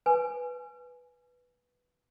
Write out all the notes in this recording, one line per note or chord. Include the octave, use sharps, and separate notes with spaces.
B4 G#5